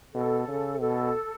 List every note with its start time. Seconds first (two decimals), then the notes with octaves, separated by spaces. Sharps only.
0.15 B2 A4
0.48 C#3
0.80 B2 A4